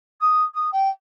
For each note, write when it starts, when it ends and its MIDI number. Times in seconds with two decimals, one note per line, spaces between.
0.20 0.42 87
0.54 0.69 87
0.72 0.88 79